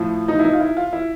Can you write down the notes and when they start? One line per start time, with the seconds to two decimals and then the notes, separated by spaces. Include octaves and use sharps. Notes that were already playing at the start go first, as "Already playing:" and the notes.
Already playing: A2 F3
0.28 D#4
0.39 E4
0.45 D#4
0.53 F4
0.60 E4
0.77 F4
0.93 E4